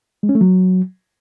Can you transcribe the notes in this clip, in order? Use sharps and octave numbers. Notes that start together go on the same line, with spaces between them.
G#3
C#4
A3
F#3